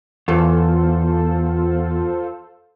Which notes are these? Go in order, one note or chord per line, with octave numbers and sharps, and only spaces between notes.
E2 F4 A4 C5